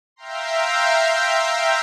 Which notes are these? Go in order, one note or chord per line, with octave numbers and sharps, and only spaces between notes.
E5 F5 G5 A#5 C6